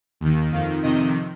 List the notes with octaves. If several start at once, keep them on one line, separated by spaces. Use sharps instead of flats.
D#2 D#3
F2 D#3 F5
F2 C3 D#3 D#5